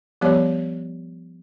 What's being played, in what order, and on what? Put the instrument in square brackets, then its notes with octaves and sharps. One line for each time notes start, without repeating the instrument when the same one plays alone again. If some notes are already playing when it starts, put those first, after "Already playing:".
[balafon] F3 G3 B3 G4 C#5